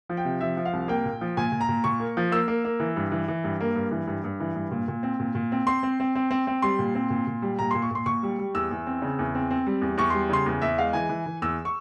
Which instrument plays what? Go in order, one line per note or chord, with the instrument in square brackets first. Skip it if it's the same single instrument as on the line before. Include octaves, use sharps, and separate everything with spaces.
[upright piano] F3
G5
C3
F3 E5
F3
F5
C2
A#3 G5
A#2
F3
A#2 G#5
A#2
A#5
A#2
A#2 C#6
A#3
F3
A#3 E6
A#3
A#3
E3
G2
E3
E3
G2
A#3
G2
E3
G2
G2
E3
G2
A#2
A#2
C4
A#2
A#2
C4
C4 C6
C4
C4
C4
C4
C4
G3 C6
A#2
C4
A#2
A#2
G3
A#2 A#5
A#2 C6
C#6
A#2 C6
A#2 C#6
G3
G3
E2 E6
E2
C4
C#3
E2
C4
C4
G3
E2
E2 C#6
G3 C6
C#3 C6
E2
E2 E5
G#3 F5
E3 G#5
E3
E3
E2 E6
C#6